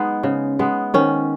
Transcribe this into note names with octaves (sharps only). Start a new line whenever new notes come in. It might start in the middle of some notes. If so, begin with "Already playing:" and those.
Already playing: G#3 B3 D#4
C#3
G#3 B3
D#3 C#4